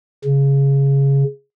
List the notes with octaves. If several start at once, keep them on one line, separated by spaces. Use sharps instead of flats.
C#3